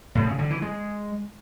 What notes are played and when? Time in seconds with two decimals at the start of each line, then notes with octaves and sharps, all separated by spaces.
0.15 A2
0.27 C#3
0.39 D3
0.50 E3
0.62 G#3